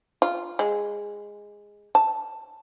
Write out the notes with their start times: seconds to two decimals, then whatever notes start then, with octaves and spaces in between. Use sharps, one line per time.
0.22 F4
0.59 G#3
1.95 A5